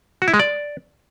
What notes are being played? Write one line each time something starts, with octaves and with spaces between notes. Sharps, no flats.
F#4
E4
G#3
D5